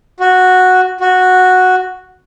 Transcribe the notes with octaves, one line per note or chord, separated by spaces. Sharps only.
F#4
F#4